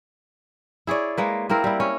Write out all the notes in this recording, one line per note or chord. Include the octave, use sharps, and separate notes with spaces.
E4 G#4 C#5 D5
G#3 A#3 B4
A#3 C4 E4 A#4
G3 E4
C#4